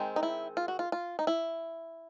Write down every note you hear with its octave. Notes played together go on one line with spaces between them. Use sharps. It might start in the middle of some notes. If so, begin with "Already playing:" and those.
Already playing: D#3 G#3 C4
D#4
E4
F4
F#4
F4
F4
D#4
E4